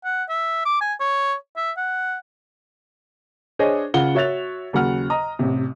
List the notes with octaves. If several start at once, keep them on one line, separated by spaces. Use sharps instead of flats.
F#5
E5
D6
G#5
C#5
E5
F#5
D4 G#4 C5 C#5 D#5 G#5
C#3 F4 F#5 G7
F#4 C#5 E5 F#6 A6 F7
D#2 C#3 F#3 F#5 F6
D#5 A#5 D#6
A1 C3